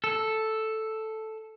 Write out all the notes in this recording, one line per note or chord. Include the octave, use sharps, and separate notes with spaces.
A4